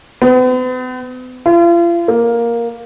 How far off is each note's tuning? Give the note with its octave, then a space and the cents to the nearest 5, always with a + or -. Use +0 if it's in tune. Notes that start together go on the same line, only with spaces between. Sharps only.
B3 +45
F4 -40
A#3 +5